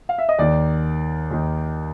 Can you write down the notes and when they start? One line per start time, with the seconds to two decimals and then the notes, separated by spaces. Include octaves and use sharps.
0.09 F5
0.18 E5
0.29 D#5
0.38 D#2 D#3 D5
1.31 D#2 D#3